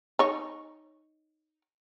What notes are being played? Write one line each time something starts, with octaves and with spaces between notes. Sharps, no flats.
D#4 C#5